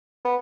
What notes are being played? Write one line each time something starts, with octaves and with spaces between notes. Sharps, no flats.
B3